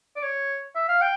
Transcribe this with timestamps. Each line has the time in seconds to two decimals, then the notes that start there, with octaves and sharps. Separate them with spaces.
0.16 D5
0.23 C#5
0.75 E5
0.88 F5
1.01 G5